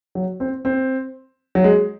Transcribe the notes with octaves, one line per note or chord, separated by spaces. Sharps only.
F#3
C4
C4
F#3
G#3